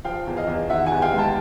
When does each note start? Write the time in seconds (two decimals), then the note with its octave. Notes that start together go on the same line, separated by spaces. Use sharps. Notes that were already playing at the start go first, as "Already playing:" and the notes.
0.05 F3 F5 G5
0.27 E2
0.37 D#5 F5
0.48 E2
0.70 D#3 E5 F#5
0.86 F#5 G#5
0.92 E2
1.02 F5 G5
1.13 G#3
1.18 G5 A5